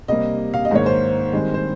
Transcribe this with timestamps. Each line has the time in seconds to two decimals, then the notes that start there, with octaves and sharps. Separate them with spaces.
0.08 C3 G3 A#3 D#5
0.54 F5
0.65 D#5
0.71 G#2 D#3 A#3 C#5
0.86 C5
1.33 G2 D#3 G#3 C4
1.54 C5